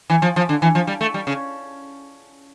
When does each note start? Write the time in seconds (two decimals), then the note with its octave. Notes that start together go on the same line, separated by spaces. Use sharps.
0.10 E3
0.22 F3
0.36 F3
0.49 D3
0.62 E3
0.75 F3
0.87 G3
1.01 A3
1.14 G3
1.27 C#3